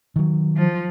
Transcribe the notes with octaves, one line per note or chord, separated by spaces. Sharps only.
D#3 F#3
F3